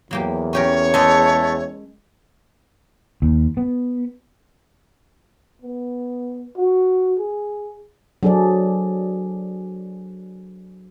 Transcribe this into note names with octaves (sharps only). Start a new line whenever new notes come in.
E2 F#3 A#3 G4
C#4 G4 A#4 C#5
G#3 A3 D#5
D#2
B3
B3
F#4
G#4
F#3 D4 G#4 A4 C5 D5